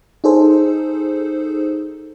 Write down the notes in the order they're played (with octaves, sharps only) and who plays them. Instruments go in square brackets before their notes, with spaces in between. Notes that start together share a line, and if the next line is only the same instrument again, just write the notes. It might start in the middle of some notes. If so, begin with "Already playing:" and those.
[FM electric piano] D#4 G#4 A4 C5